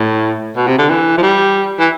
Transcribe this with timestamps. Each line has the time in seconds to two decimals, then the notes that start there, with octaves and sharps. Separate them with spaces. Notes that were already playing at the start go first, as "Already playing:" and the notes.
Already playing: A2
0.57 B2
0.67 C3
0.78 D3
0.90 E3
1.18 F3
1.23 G3
1.80 E3